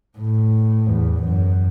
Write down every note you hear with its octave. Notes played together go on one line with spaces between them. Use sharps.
A2
E2
F#2